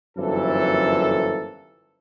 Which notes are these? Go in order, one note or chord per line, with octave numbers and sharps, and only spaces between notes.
G1 F#2 E3 F3 A#3 A4